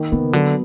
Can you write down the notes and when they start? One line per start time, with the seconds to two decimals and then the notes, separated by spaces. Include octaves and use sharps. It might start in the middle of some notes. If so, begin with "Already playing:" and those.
Already playing: D#3 A#3
0.12 C#3 B3
0.33 D3 F#3